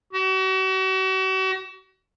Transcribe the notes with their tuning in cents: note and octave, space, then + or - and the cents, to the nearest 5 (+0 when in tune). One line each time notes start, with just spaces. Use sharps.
F#4 +40